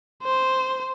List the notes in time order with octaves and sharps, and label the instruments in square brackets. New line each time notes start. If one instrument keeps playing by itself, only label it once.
[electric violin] C5